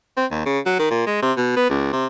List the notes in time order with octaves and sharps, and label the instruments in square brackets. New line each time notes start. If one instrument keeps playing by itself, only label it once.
[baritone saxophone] C4
D#2
C#3
F#3
D#3
A#2
G#3
C3
B2
B3
C#2
C3